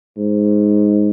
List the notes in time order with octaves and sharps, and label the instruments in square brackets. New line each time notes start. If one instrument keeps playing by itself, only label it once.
[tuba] G#2